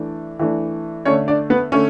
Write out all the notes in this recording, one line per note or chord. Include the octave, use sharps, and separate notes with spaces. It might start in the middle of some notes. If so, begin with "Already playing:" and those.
Already playing: E3 A3 D4
E3 A3 D4
D3 A3 C#4 D4 C#5
D4 D5
B3 B4
D3 A3 C#4 C#5